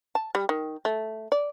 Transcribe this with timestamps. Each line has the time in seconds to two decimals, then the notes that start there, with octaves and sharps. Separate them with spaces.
0.15 A5
0.35 G3
0.49 D#3
0.85 A3
1.32 D5